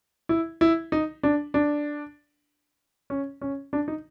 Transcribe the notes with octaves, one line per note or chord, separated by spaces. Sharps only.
E4
E4
D#4
D4
D4
C#4
C#4
D4
D#4